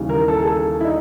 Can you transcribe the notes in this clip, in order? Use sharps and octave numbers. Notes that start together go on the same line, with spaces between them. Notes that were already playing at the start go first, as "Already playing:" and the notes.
Already playing: D#2 C#3 E3 G3
A#4
A4
G#4
A4
E4
D#4